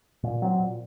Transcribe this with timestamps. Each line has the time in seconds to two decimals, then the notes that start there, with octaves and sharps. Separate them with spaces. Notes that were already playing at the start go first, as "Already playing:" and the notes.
0.23 A#2
0.42 F#3 C4
0.59 A#2